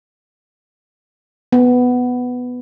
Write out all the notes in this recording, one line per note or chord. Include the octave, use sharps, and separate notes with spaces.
B3